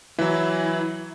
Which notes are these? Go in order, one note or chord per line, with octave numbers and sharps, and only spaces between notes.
E3 F#3 E4